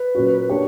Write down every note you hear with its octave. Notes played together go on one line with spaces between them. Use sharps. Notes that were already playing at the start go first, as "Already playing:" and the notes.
Already playing: B4
A#2 F#3 C#4 F#4
A#3 D4 G4 C#5